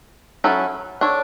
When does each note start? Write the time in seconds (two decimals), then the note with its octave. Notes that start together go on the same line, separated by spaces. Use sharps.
0.44 F#3 C#4 E4 A4
1.01 D4 A4 C#5